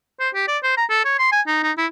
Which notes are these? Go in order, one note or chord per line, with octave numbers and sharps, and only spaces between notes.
C5
G4
D5
C5
A#5
A4
C#5
C6
G#5
D#4
D#4
E4